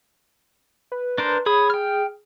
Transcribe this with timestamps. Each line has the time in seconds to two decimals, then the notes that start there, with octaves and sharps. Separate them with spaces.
0.92 B4
1.18 D4 A#4 C5
1.46 G#4 C#5 B5 D#6
1.70 G5 F6